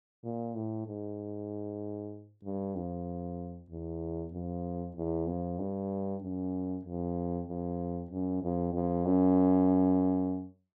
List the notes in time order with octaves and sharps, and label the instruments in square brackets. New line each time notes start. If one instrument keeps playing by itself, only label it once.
[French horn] A#2
A2
G#2
G2
F2
E2
F2
E2
F2
G2
F#2
F2
F2
F#2
F2
F2
F#2